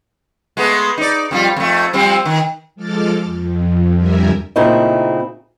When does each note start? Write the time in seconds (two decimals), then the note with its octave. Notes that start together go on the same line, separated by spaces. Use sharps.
0.57 G#3 A3 B3
0.98 D#4 D5
1.31 F2 G3 F4
1.56 F2 A3
1.93 F3 G3 C4
2.25 D#3
2.75 F3 G#3 A4 D6 F6 A6
3.24 F2
3.95 F2 D3 G3 A#4 E5 G#5
4.56 A#2 C#3 A3 C4 D#4 E4